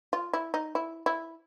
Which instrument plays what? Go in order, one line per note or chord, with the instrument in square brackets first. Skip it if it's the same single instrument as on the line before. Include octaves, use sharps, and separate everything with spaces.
[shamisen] F4
E4
D#4
E4
E4